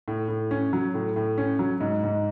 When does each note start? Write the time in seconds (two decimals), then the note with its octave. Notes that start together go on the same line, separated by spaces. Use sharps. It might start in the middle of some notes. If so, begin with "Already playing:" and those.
0.08 A2
0.28 A2
0.51 C#4
0.73 F#3
0.94 A2
1.16 A2
1.38 C#4
1.59 F#3
1.80 G#2
2.03 G#2